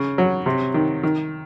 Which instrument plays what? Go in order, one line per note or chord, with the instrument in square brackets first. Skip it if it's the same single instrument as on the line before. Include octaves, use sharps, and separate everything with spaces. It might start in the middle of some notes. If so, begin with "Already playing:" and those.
Already playing: [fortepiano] C#3
F#3
C3
D#3
D#3